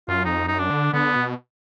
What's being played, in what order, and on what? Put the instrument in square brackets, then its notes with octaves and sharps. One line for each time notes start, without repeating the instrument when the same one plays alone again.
[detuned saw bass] F#2 [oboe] F4
[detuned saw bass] F2 [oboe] D#4
[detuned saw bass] F#2 [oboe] D#4
[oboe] D4
[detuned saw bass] D3
[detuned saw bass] D3 [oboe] B3
[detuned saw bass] B2